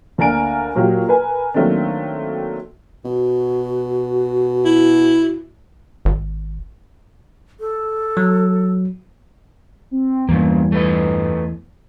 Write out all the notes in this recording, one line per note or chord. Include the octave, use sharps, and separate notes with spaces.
D2 A#3 D4 A#4 G#5 D7
A#2 F#3 A#3 F#4 G4
A#4 B4 G#5
D#3 F#3 A3 A#3 C4 D4
B2 F#4
E4
G#1
A4
F#3
C4
E2 G2 C#3 A#3
A3 B4 D#5